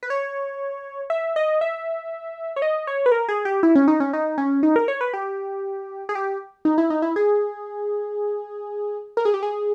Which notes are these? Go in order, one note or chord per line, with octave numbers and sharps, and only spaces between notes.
B4
C#5
E5
D#5
E5
C#5
D#5
C#5
B4
A#4
G#4
G4
E4
C#4
D#4
C#4
D#4
C#4
D#4
A#4
C#5
B4
G4
G#4
G4
D#4
E4
D#4
E4
G#4
A#4
G#4
G4
G#4